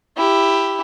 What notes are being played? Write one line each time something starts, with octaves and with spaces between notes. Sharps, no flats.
E4 G4